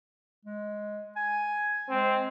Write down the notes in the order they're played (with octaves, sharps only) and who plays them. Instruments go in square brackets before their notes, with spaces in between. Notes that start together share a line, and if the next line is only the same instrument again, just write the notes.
[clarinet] G#3
G#5
[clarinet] G#3 [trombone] C4